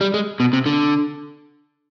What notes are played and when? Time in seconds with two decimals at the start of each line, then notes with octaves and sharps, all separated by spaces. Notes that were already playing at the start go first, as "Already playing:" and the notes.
0.01 G3
0.14 G#3
0.40 B2
0.53 C3
0.66 D3